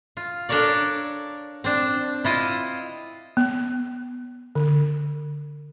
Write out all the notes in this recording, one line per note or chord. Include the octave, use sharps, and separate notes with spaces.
F4
D4 A4 A#4 C#5 D5
C4 D4
E4 F4 D#5
B3
D3